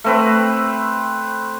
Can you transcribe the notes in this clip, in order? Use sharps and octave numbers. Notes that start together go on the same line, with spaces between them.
A3 C4 B4